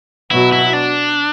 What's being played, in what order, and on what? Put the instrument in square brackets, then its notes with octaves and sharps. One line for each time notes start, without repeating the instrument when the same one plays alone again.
[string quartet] B2 F#3 B3 F#4 [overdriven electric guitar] E4
[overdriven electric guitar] E4
D4